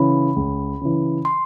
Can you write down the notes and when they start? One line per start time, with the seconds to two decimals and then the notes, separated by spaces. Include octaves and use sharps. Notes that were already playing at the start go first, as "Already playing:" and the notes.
Already playing: C#3 E3 B5
0.36 C#2
0.81 C#3 E3
1.25 C6